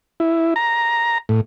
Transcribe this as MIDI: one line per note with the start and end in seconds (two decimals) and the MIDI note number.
0.20 0.54 64
0.56 1.18 82
1.29 1.41 45